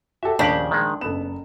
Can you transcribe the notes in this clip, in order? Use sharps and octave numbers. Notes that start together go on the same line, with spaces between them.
F#4 G4 A4 E5
A#1 D#2 C#3 D4 G4 F#7
D#3 G#3
F#1 B3 A4 E7